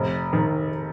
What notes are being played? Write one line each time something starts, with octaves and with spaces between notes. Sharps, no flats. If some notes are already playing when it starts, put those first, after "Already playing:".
Already playing: F1
D#3